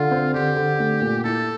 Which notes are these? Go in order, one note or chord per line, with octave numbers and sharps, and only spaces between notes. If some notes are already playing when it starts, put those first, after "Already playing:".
Already playing: D3 F4
C4
D3 G4
D3
A3
A#2
E4 A4